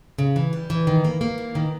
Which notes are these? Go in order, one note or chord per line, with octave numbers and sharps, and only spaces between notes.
C#3
E3
G3
E3
D#3
A#3
A#3
E3
D#3